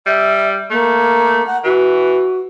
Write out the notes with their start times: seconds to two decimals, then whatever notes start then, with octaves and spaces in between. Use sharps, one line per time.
0.06 G3 E5
0.71 A3 A#3
1.46 F#5
1.64 E3 F#4